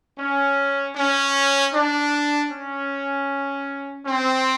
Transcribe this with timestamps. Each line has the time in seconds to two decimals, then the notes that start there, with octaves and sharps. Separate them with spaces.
0.18 C#4
0.95 C#4
1.73 D4
2.50 C#4
4.06 C4